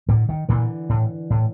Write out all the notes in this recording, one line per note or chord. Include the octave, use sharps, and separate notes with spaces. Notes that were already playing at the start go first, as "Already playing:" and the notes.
A2 D3
D#3
A#2 D3 E3
A2
A2